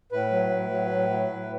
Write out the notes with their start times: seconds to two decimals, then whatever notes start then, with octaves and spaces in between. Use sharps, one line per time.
0.12 A2 B4
0.31 F#3
0.50 A2
0.70 F#3
0.90 A2
1.10 F#3
1.28 A2